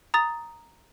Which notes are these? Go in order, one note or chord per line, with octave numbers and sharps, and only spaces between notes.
A#5 D#6 A6